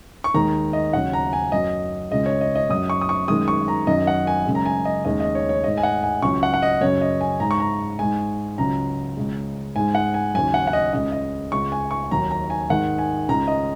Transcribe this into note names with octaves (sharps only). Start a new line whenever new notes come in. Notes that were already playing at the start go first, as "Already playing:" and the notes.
C#6
D#2 D#3 G#3 A#5
D#5
D#2 C#3 F#3 F#5
A#5
G#5
F#2 F#3 D#5
C#2 C#3 G#3 D#5
C#5
D#5
D#5
F#2 F#3 D#6
C#6
D#6
C#6
F#2 D#3 G#3 D#6
C#6
A#5
F#2 D#3 F#3 D#5
F#5
G#5
F#2 C#3 G#3
A#5
G#5
D#5
D#2 C#3 G#3 D#5
D#5
C#5
C#5
G#2 G#3 D#5
G#5
F#5
G#5
C#2 C#3 F#3 C#6
F#5
F#5
D#5
F#2 C#3 F#3 C#5
D#5
G#5
G#2 G#3 A#5
C#6
A#5
G#2 G#3 G#5
C#2 C#3 F#3 A#5
C#2 C#3 G#3
G#2 G#3 G#5
F#5
G#5
D#2 C#3 F#3 G#5
F#5
F#5
D#5
C#2 C#3 G#3 D#5
D#5
C#2 C#3 G#3 C#6
G#5
C#6
D#2 D#3 F#3 A#5
A#5
G#5
G#2 D#3 G#3 F#5
G#5
C#2 C#3 G#3 A#5
D#5